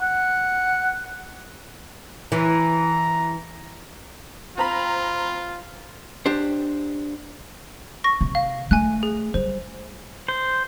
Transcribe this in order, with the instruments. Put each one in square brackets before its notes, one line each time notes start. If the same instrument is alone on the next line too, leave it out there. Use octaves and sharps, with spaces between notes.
[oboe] F#5
[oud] E3 [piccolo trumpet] A#5
[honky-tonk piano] C4 A#5 B5 [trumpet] F4
[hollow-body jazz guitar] D4 G4 C5
[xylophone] C#6 A#6
[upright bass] C3
[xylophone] F5
[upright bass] A3 [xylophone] G#5 F#6
[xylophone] G#4
[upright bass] G3 [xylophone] C5
[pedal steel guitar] C5